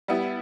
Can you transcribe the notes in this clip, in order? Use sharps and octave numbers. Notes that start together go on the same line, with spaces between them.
G3 B3 E4